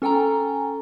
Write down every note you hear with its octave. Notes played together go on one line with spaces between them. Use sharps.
C#4 A4 G5 G#5 A#5